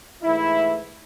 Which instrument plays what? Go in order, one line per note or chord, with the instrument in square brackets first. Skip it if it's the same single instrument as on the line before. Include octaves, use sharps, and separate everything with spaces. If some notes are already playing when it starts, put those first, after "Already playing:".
[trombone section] G#2 E3 A3 E4